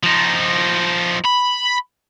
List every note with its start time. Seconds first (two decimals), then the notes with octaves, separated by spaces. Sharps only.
0.03 F3 D#4
1.24 B5